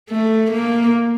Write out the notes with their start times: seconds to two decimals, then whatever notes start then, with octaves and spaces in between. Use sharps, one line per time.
0.10 A3
0.51 A#3